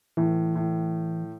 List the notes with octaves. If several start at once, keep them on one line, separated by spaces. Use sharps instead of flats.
A2 E3
A2